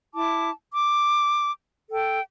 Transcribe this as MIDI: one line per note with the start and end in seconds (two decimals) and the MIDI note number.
0.14 0.50 64
0.14 0.50 81
0.14 0.50 86
0.72 1.51 86
1.91 2.20 69
1.91 2.20 79